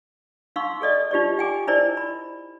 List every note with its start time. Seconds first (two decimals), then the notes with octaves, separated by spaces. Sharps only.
0.56 D#4 F5 C6 C#6 E6
0.80 G#4 A4 D5 D#5
1.11 D#4 F4 G4 C5 D5
1.38 G4 G5 G#5 D6
1.67 D#4 E4 A#4 C5 D5 D#5
1.97 B5